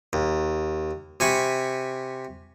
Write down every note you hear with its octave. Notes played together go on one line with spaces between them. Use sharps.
D#2
C3 G#5 B5 C#6